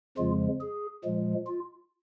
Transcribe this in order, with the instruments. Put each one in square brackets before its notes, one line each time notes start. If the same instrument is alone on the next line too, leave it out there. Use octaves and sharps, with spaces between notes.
[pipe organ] F2 C#3 F3 G#3 F4
G#4
A#2 F3 G#3
F4